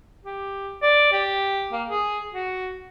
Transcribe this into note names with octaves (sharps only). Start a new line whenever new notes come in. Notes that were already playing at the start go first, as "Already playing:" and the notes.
G4
D5
G4
A#3
G#4
F#4